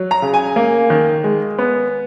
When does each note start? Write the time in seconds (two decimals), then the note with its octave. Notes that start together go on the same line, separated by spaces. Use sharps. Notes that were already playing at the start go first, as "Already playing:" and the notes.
Already playing: F#3
0.11 A#5
0.22 C#3
0.34 G#5
0.56 A#3
0.90 D#3
1.24 G#3
1.59 B3